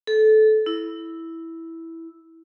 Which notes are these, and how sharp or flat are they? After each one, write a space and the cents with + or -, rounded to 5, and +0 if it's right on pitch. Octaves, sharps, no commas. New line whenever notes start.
A4 -20
E4 -5